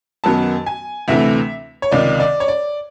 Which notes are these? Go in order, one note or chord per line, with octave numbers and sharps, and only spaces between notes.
F#2 D#3 F#3 B3 A5
G#5
D2 C3 E3 A3 C4 E5
C#5
C#2 C3 D#3 D5
D5
C#5
D5